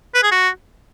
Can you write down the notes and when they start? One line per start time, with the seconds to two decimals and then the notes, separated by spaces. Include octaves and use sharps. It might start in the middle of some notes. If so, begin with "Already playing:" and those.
0.14 B4
0.23 G#4
0.31 F#4